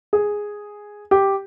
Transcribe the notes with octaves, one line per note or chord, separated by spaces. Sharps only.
G#4
G4